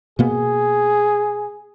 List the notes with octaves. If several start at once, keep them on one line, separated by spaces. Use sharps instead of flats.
B2 A#3 B3 G#4